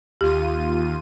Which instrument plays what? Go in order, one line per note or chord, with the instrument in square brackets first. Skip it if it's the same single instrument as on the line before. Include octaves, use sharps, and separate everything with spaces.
[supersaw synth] D#2 F4 D#7 [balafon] G4